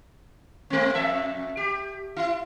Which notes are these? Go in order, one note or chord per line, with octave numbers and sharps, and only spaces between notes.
G#3 C4
F2 A4 E5
G4
E4